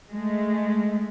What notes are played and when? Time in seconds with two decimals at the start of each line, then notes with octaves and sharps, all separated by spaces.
0.11 G#3 A3